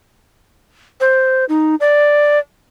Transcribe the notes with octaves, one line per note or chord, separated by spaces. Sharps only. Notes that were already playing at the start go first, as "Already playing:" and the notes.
C5
D#4
D5